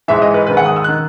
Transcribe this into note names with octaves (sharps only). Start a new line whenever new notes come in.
G#2 E3 E5
D#5
B4
G#2 D#3 B4
F#5
D#6
E6
F#6
D#3